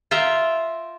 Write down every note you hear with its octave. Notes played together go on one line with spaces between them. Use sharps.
F4 E5 G5 A#5